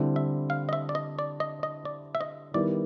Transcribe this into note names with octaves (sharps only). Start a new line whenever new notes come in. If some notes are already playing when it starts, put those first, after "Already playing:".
Already playing: D3 G3 C4 E4
E5
F5
D#5
E5
D5
D#5
D5
D#5
D#5
D5
E5
D#5
D#3 G3 B3 E4 D5